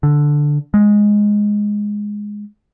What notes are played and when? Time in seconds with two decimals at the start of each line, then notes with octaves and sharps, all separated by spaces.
0.03 D3
0.74 G#3